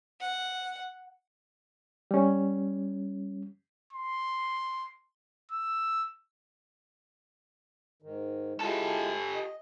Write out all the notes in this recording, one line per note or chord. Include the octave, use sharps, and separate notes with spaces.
F#5
G3 C#4
C6
E6
G#2 D#3
G#3 E4 F4 G4 A4
D#5